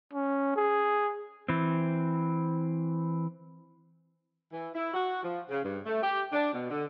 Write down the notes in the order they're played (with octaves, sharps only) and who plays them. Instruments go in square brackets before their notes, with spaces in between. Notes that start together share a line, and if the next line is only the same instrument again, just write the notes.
[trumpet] C#4
G#4
[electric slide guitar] E3 C4
[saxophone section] E3
E4
F#4
F3
C#3
G2
A3
G4
D4
B2
D3